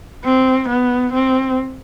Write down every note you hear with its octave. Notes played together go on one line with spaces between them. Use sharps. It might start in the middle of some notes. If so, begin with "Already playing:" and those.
C4
B3
C4